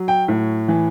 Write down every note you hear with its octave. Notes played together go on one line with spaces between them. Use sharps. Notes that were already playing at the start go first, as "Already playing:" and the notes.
Already playing: F#3
G5
A2
E3